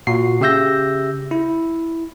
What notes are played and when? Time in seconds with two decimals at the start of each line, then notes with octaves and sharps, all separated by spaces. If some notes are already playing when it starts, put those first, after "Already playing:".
0.07 A#2 F#4 C7
0.41 C#3 G4 E5 E6 G6 A#6
1.31 E4